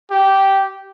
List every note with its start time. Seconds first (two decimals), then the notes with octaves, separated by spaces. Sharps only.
0.11 G4